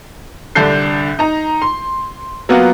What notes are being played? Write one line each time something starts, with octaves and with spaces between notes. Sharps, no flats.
C2 D3 D4 A4 G6 C7
D#4 A#5
C6
F#3 A#3 B3 F4 F#4